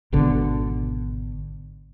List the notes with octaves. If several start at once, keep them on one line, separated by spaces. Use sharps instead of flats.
G#1 B2 D3